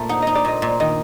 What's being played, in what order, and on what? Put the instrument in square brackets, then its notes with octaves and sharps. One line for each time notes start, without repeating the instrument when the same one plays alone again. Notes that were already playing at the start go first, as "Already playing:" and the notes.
Already playing: [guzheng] A#2 A3
[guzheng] D#4 [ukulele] F#5
[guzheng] D#4 [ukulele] D#5
[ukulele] D5
[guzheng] A#2 [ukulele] D#5
[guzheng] A#2
[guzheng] D#3 [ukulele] D#5